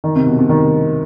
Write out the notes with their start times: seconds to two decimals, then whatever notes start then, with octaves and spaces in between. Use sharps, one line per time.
0.04 D#3
0.16 C3
0.26 B2
0.39 C3
0.49 D#3